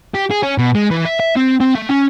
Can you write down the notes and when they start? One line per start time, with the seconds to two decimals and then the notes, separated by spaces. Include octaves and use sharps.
0.15 G4
0.31 G#4
0.43 C#4
0.58 B2
0.75 G#3
0.90 E3
1.05 E5
1.20 E5
1.36 C4
1.61 C4
1.75 A3
1.89 C#4